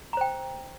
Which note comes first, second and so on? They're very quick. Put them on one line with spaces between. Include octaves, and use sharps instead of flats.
A#5 C5 G5